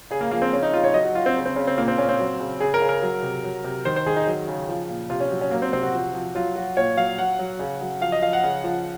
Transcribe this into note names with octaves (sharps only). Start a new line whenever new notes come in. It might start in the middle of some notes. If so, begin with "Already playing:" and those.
C#3 G#4
A#3
F3 A#3
C4
C#3 C#4
D#4
C#3 F4
C#5
F#3 D#5
F#4
F#3 F4
C4
C#3
C4
C#3 C#4
C4
A#2 A#3
C4
A#2 C#4
C4
F#3
C#3
C#3 G#4
A#4
C#3
A#4
F#3
C3
F#3
C3
D#3 C5
C5
D#3 G#4
D#4
F#3
C#3
F3
A#2
C3 F4
C#4
F#3
C#4
F#3 A#3
C4
C3 C4
F#4
F3
F3
F#3 F4
F#3 F#4
A#2 C#5
F#3 F5
F#3 F#5
F#3
C#3
F#3
F3 F5
D#5
F3 F5
F#5
C#3
F3